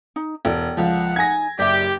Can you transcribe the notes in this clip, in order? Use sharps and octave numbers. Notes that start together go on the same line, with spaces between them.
D#4
E1 A4 D5 G5
C#2 F3 F#5
D#4 G#5 G#6 A#6
F#1 G4 D5 E5